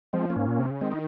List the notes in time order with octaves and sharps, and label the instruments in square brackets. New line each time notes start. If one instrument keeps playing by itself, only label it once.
[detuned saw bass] F3 [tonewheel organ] G#3 C4
[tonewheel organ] A#3 C#4
[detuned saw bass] G#2
A#2
C3
C#3
[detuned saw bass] D#3 [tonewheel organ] G#3 C4
[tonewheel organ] D#4